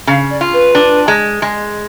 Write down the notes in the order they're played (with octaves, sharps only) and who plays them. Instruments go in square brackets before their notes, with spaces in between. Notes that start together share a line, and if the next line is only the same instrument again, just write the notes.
[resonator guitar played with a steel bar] C#3 [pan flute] F5
[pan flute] D5
[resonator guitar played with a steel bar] F4
[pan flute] B4
[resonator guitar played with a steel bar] D4
G#3
G#3